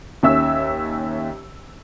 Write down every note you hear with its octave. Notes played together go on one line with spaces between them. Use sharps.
D#2 C#4 E5 E6